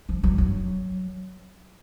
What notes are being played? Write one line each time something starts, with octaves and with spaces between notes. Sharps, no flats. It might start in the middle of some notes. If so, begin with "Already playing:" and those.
F3
F#3
F#3